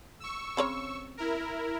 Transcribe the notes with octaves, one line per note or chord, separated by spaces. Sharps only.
C#6 E6
C#3 C4 C#5
E4 A#4